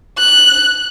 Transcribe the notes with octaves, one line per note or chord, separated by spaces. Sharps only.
F#6